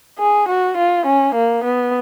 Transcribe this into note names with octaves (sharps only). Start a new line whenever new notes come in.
G#4
F#4
F4
C#4
A#3
B3